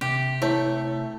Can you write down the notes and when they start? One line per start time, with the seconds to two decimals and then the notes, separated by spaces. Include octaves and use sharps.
0.01 C3 G4
0.42 A3 E4 C#5